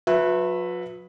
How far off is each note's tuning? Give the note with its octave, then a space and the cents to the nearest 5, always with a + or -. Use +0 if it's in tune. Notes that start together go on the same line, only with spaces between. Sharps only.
F#3 -45 B4 +0 E5 +0